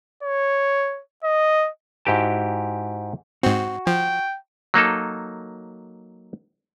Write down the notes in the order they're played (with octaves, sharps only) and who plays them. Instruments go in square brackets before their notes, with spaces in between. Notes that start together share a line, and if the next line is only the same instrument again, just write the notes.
[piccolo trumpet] C#5
D#5
[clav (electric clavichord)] G#2 E4 F#4 G4 G5 A5
[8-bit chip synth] G#2 C4 [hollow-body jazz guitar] F#4
[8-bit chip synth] F3 [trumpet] G5
[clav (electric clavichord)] F#3 A#3 D#4 A4